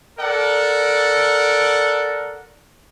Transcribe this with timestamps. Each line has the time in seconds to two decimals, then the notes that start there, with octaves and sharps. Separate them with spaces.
0.19 A4 A#4 D5 F#5